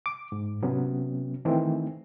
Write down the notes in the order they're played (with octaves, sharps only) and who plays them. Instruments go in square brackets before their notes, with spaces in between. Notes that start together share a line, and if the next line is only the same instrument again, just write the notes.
[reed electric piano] D6
G#2
C3 F#3 B3 C#4
D#3 E3 A3 C4